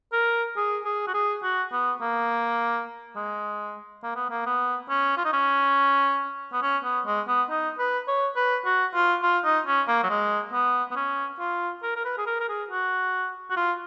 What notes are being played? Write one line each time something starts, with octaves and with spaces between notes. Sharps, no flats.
A#4
G#4
G#4
F#4
G#4
F#4
B3
A#3
G#3
A#3
B3
A#3
B3
C#4
F4
D#4
C#4
B3
C#4
B3
G#3
B3
D#4
B4
C#5
B4
F#4
F4
F4
D#4
C#4
A#3
F#3
G#3
B3
B3
C#4
F4
A#4
A#4
B4
G#4
A#4
A#4
G#4
F#4
F#4
F4